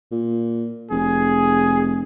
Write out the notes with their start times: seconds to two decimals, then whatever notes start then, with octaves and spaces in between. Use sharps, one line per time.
0.12 A#2
0.91 F1 G#4